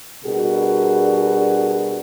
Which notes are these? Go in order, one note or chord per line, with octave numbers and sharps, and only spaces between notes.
B2 G3 D4 F#4 G#4 A#4